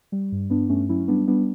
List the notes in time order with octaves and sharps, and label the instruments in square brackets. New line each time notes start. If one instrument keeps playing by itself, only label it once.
[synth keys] G3
G2
G2 B3 D4
G2 A3 C#4
F#3 C#4 E4
G3 B3 D4
G3 B3 D4